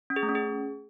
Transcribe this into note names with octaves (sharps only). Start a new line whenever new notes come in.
C#4
G#4
A3
C#4
G#4